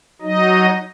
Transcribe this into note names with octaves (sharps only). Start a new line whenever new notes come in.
F#3 D#4 D#5